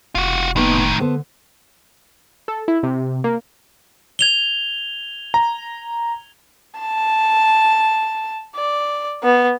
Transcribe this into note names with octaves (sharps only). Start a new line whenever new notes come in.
F1 F4 F#4
A2 D#3 A#3 B3 D#4
D3 A3 B3 C5
A4
E4
C3
A#3
G#6 F7 G7
A#5
A5
D5
B3